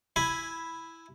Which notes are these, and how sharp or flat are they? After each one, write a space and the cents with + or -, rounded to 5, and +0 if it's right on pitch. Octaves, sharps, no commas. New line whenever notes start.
E4 +0 G#5 +0 B5 +0